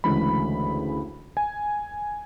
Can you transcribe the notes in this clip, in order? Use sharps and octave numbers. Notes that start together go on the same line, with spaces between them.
D2 C#3 E3 G#3 B5
G#5